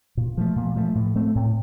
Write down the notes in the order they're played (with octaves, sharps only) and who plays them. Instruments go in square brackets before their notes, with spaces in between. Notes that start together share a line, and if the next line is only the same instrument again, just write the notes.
[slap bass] A#2
F3 A3
A#2
F3 A3
A2
A3 C4
A2